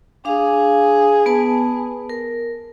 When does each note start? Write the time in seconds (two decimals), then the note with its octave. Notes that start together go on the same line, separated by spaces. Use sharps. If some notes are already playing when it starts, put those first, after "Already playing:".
0.25 D4 G#4 F5
1.26 B3 B4 A5
2.09 A#4